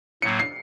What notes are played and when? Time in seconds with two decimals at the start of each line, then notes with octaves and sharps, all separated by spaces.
0.22 A2 F#3 A#3 C#7
0.39 C7